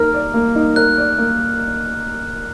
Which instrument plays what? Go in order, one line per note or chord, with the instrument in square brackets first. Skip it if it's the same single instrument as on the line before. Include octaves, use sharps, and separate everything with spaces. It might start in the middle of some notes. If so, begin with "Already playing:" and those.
Already playing: [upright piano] A#3 D#4 A#4 [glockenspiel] F6
[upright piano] D5
A#3
D#4
[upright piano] A#4 [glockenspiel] F#6
[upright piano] D5
A#3